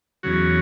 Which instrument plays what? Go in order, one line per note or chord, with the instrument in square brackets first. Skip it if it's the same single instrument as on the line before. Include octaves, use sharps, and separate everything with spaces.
[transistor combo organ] E2 C#3 F#3 F#4